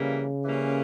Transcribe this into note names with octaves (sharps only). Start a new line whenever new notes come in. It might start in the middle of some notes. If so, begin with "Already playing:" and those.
Already playing: C#3 E3 G3 A#3 C#4
E3 G3 A#3 C#4